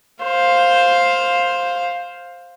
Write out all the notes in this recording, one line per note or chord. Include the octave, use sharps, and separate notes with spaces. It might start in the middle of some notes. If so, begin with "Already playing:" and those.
C5 F5